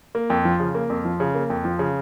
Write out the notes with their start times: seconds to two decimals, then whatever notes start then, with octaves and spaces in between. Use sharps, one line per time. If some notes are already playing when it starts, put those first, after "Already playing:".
0.15 A#3
0.30 F2
0.45 F3
0.60 C#3
0.75 A#3
0.90 F2
1.05 F3
1.20 C#3
1.35 A#3
1.50 F2
1.65 F3
1.79 C#3